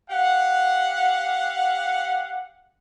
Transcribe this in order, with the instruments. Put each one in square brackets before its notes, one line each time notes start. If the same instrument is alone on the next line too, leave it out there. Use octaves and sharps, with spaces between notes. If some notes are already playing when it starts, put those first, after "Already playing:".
[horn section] G4 F5 F#5